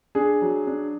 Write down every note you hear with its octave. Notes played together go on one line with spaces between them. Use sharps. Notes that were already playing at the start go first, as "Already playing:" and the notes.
D4 G#4
F#3
D4